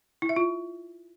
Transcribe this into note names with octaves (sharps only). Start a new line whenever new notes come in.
E4
E5
F4